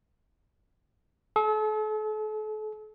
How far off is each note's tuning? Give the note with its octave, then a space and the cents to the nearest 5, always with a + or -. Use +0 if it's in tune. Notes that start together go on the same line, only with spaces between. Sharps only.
A4 -40